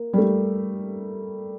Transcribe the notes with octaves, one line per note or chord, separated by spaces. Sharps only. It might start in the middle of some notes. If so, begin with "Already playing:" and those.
Already playing: A#3
G3
A3